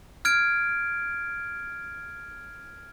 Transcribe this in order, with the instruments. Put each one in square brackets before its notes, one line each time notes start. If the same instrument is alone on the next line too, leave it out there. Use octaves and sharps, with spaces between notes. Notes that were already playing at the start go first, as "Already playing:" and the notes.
[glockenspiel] F6 G#6 D7